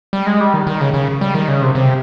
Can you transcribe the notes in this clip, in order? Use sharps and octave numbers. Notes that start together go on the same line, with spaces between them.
G3
G#3
G3
D#3
D#3
C#3
C#3
G3
D#3
C#3
C3
C3